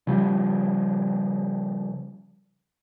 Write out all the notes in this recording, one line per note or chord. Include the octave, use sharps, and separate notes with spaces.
C#3 F3 G3